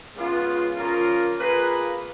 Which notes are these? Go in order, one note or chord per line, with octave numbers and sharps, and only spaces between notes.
C#3 G#3 B3 F4
C#3 F3 A#3 F4 A#4
A#3 F4 G#4 B4